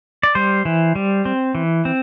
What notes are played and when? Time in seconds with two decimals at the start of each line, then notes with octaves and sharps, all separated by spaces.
0.23 D5
0.35 G3 C5
0.65 E3
0.95 G3
1.25 C4
1.55 E3
1.85 C4